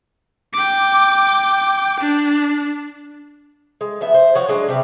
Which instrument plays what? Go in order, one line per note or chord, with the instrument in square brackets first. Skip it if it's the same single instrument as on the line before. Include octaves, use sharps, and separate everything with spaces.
[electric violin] G5 D6
D4
[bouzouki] G#3
F3 B3 E5
C5
F3 F#4 C#5 F#5
F#3 G#3 D4
C3 G3 B4